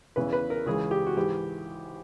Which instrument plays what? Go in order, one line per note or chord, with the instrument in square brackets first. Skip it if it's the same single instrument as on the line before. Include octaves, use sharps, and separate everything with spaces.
[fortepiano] E2 C#3 E3 B4
B4
A#4
C#2 C#3 E3 G#4
G4
F#4
G#2 E3 G#3 G4